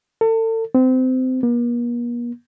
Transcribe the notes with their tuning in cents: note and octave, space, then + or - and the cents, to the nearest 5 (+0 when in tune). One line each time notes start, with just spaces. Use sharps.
A4 +35
C4 -25
A#3 +45